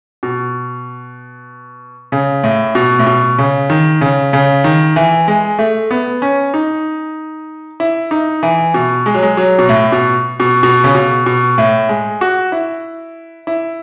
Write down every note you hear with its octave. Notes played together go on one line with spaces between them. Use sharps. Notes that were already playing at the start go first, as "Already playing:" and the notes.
B2
C#3
A2
B2
A2
B2
C#3
D#3
C#3
C#3
D#3
E3
G#3
A3
B3
C#4
D#4
E4
D#4
E3
B2
G#3
F#3
G#3
F#3
B2
A2
B2
B2
B2
C#3
B2
B2
A2
G#3
F#4
E4
E4